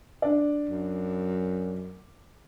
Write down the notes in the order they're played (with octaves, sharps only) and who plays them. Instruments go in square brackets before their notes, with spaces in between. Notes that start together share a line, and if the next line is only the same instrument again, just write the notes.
[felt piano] D4 D5
[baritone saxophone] F#2